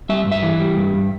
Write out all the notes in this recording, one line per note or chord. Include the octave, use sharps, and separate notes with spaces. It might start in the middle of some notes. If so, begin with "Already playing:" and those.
G3 E5
G2
E5
E3
G3
G2
G2